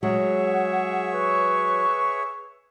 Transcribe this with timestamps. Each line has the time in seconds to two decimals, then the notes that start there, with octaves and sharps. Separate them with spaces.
0.03 F#3 G#3 G#4 C#5 E5 F#5
1.13 B4 C#6